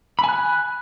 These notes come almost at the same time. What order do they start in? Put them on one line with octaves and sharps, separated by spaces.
B5 G#5 F#6